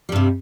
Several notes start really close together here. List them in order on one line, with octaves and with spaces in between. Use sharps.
G3 G2 C3